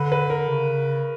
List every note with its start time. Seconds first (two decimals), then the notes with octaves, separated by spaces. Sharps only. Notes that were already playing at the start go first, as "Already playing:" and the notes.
Already playing: D3 B4
0.12 B4
0.30 A#4
0.49 C#3